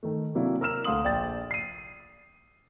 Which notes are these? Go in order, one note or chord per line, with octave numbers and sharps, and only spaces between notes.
D#3 A3
C3 F#3 A#3 D4 E4
A#4 E6 F6 E7
D2 F5 C6 D#6 F#7
A#1 D5 G5 A6
C7 D#7